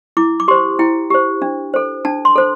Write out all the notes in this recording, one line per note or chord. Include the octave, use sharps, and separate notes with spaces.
E4 D6
D6
G4 C5 C6
E4 G5
G4 C5
D4
A4 C5
D4 A5
C6
A4 C5